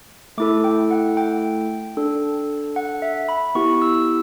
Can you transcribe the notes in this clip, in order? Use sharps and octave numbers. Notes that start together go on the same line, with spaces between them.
A3 E4 A4 D6
G5
F#5
G5
D4 A4
F#5
E5
B5
B3 E4 G4 C#6
E6